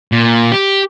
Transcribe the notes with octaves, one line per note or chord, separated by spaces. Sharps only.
A#2
G4